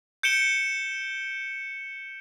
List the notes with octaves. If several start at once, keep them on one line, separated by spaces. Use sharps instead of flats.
G6 C#7 D7 E7 G7